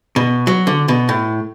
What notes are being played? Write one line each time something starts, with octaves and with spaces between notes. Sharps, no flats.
B2
F#3
D3
B2
A2